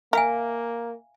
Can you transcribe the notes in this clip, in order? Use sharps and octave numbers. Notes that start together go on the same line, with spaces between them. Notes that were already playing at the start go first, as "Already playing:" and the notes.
A#3 A#4 E5 F5 G#5